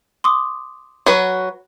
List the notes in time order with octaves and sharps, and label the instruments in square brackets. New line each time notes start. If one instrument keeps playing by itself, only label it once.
[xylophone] C6 D6 D#6
[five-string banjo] F#3 F#4 B4